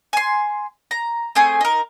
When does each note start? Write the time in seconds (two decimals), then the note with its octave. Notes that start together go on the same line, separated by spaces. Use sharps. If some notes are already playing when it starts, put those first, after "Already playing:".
0.13 G#5 C6
0.91 A#5
1.35 A3 C4 G#4 G#5
1.61 D#4 A#4